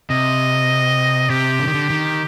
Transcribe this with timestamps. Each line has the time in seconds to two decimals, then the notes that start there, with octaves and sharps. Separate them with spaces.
0.10 C3 D#5
1.30 C3 G4
1.60 D3
1.67 D#3
1.74 D3
1.90 D#3